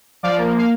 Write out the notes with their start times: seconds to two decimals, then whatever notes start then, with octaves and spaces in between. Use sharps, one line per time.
0.23 F3 D5 F5
0.38 A#3
0.58 F5